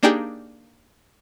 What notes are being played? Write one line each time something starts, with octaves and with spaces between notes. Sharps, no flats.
A#3 D4 D#4 G4 G#4